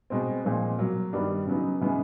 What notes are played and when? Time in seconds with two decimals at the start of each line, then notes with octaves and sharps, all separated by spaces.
0.10 B2 G#3 C4
0.44 A#2 F3 G#3 C4
0.78 B2 F#3 A#3
1.13 G2 D#3 G3 B3 D4
1.46 C#3 F#3 B3 D#4
1.81 C#3 E3 G#3 B3